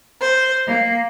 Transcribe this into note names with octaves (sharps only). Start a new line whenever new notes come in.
C5
A#3